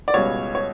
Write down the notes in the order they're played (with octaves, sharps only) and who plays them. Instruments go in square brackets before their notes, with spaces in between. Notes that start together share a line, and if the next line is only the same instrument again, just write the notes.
[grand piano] D5
C#2 B2 G3 C#5
C#5